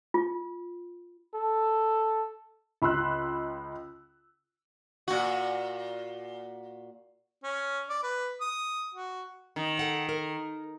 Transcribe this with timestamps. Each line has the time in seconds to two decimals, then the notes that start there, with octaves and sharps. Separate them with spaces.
0.14 F4
1.34 A4
2.82 C#2 B5 C6 E6 F#6
5.08 A#2 F#4
7.44 C#4
7.89 D5
8.03 B4
8.41 D#6
8.94 F#4
9.56 D#3
9.77 A4 F#5 G5
10.09 A#4